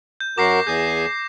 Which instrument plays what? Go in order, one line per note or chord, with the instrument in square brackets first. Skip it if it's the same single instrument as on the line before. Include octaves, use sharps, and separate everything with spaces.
[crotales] G6
[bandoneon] F#2 F#4 A#4 [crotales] D6 A#6 C7
[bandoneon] E2 G#4 G#5 [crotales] G6